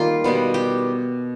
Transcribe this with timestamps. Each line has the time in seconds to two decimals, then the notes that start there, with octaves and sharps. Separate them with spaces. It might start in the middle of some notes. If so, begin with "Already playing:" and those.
Already playing: D#3 G3 A#3 F4
0.24 B2 G3 B3
0.54 G4